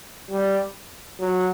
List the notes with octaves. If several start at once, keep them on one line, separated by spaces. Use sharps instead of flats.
G3
F#3